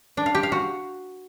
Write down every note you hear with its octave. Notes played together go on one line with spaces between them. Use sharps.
D4
F5
G4
F5
F#4